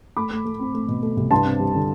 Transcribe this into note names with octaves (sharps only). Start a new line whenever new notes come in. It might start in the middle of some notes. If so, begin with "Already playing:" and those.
A3 B5 D6
A3
A3
C4
A3
B2
A3
C2
G2 A5 C6
C4
G3
D3